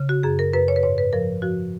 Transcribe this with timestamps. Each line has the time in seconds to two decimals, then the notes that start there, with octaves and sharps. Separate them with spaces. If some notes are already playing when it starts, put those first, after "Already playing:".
Already playing: C#3
0.09 F#4
0.23 F#2 G#4
0.39 A#4
0.53 F#2 B4
0.68 C#5
0.76 B4
0.83 G#2 C#5
0.98 B4
1.13 F3 A#4
1.42 F3 F#4